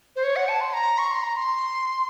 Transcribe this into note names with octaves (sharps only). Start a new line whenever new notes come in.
C5
C#5
F#5
A5
C6
A#5
C#6
C6
A#5
C6